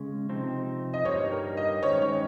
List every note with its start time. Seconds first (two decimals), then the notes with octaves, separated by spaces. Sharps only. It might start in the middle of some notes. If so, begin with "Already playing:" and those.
Already playing: C#3 G#3 C#4
0.29 C3 F3 C4 D#4
0.94 D#5
1.05 G2 G3 A#3 D#4 C#5
1.32 A#4
1.57 D#5
1.82 D#3 G#3 C#4 C#5
2.02 C#5